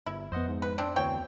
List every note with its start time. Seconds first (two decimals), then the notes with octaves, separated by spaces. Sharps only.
0.06 G1 E4
0.32 F2 B3 C5 D#5 F#5
0.48 G#2
0.62 B4
0.78 C4 D4
0.96 D2 E3 C4 C#5 G5